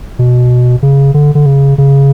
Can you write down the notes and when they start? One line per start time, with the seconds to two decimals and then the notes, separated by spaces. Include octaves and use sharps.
0.19 B2
0.83 C#3
1.14 D3
1.35 D3
1.46 C#3
1.78 C#3